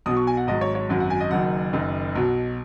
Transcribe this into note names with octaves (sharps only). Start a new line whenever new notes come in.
B1 B2 F#3 D#6
C#6
G#5
F#5
G#1 G#2 F#3 D#5
C#5
C#5
G#1 F#2 F#3
F#5
G#5
D#5
F#1 F#2 D#3 F#3 F#5
F#1 F#2 D#3
B1 B2 F#3